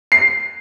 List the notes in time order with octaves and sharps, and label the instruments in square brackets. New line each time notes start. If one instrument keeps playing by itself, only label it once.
[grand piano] C7